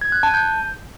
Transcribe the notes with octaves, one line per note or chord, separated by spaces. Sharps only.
G#6
F#6
A5
G6